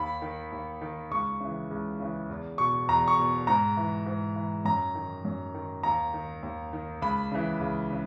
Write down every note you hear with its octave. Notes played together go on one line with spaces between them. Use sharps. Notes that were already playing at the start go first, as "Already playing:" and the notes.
Already playing: D#2 B5
D#3
D#2
D#3
C#2 C#6
C#3 E3
C#2
C#3 E3
E2
B2 C#6
E2 A#5
C#6
B2
G#2 A#5
E3
G#2
E3
F#2 A#5
D#3
F#2
D#3
D#2 A#5
D#3
D#2
D#3
C#2 B5
C#3 E3
C#2
C#3